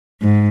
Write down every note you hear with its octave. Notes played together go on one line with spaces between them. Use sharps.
G#2